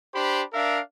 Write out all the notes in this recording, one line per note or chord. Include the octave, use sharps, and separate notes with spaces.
D4 G4 C5 B5
D4 A#4 E5 F5